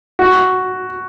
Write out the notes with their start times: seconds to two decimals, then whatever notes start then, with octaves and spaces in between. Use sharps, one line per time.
0.19 F#4